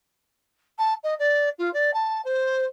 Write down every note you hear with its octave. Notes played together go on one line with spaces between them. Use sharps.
A5
D#5
D5
F4
D5
A5
C5